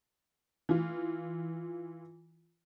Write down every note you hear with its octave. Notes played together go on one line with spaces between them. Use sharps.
E3 F4